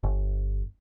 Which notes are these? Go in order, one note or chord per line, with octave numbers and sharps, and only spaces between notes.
G1